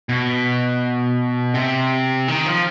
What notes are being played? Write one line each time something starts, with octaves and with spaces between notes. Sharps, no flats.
B2
C3
D#3
F3